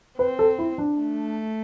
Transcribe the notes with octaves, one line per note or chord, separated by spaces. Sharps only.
C4 B4
A4
E4
D4
A3